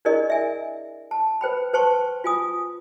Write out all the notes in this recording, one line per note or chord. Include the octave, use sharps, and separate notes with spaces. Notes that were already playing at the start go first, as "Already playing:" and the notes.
D4 E4 G#4 A#4 D5 D#5
E5 G#5
A5
B4 C5 G5 B5
B4 C5 G5 A5 C6 C#6
F4 G#5 D#6